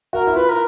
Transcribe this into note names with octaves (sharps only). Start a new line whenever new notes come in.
F#4 A#4
E4
F4 B4
A#4